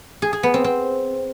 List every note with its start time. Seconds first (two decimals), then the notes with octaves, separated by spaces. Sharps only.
0.22 G#4
0.33 G#4
0.43 B3
0.54 C4
0.64 C4